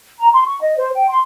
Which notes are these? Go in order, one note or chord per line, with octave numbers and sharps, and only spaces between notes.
A#5
C6
C#6
D#5
C5
G5
C6